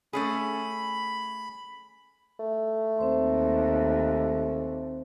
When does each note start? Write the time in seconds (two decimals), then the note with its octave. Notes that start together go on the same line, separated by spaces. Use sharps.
0.13 A3 C#4 G#4 B5
2.39 A3
2.98 D#2 C4 C5 C6